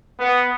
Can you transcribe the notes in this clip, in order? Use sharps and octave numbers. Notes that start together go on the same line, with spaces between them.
B3